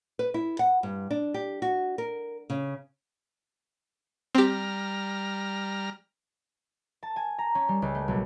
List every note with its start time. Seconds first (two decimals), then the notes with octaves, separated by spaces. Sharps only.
0.19 B4
0.34 E4
0.59 F#5
0.83 G2
1.11 D4
1.34 G4
1.62 F#4
1.98 A#4
2.50 C#3
4.35 G3 C4 G4 A#5 F6
7.03 A5
7.16 G#5
7.38 A#5
7.55 C#4
7.69 G3
7.82 C#2
7.95 A3
8.08 B1